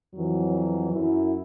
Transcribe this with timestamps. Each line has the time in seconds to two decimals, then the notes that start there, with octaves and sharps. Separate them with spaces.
0.15 F2 E3 F#3
0.92 F#2 E4